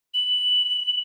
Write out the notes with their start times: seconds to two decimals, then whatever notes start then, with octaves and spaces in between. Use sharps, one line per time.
0.14 F#7